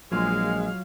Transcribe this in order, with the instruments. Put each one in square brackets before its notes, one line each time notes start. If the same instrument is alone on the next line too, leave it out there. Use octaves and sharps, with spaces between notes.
[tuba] A#1 [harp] F#3 F4 [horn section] G#3 [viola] F5